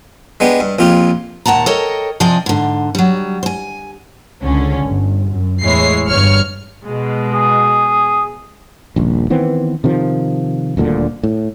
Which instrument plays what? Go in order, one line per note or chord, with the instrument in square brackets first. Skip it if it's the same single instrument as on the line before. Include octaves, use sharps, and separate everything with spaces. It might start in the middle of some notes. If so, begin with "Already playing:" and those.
[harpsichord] G#3 B3 D4 G4
G2
A#1 F2 F4 G4
[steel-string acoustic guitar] D#2 A#2 F#5 A5 A#5
A4 A#4 C#5 D#5 G5
C3 F3 D5 D#5 G5 G#5
G#2 D3
F#3 G3
C5 G#5
[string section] C#2 D3 C#4
G1
F#2
E2 A2 G#3 E4 C#5 C7
G1 G2 C#5 F6 C#7
B2 G#3
[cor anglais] G#4
[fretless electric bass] D#1 A#1
D#3 E3 B3 C4
C3 D#3 F3
D#1 D2 A#2 D3
A2